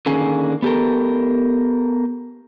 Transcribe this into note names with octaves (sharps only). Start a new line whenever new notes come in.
D3 D#3 A#3 C#4 G#4
B3 G4 A4 A#4